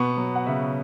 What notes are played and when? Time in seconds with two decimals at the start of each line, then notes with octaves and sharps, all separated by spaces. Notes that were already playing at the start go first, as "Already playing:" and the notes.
Already playing: B2 B3 C#6
0.17 F#3
0.35 F#5
0.46 C#3 E5